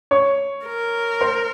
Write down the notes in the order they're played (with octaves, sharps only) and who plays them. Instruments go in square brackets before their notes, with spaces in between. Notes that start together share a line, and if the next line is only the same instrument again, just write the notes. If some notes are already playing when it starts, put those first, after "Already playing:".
[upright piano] C#5 C#6
[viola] A#4
[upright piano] C5 C6